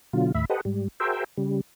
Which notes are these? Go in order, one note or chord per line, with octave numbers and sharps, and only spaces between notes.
B2 D3 F#3 F4
D#2 A2 E5 B5
G4 A4 B4 C5 D#5 F#5
G#2 G3
F#4 G#4 A#4 C5 E5 G5
C#3 G3